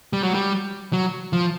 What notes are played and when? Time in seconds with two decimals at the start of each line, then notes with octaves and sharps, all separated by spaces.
0.13 G3
0.23 F#3
0.34 G3
0.93 F#3
1.33 F3